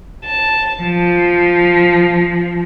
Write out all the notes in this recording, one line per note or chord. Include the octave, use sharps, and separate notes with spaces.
A5
F3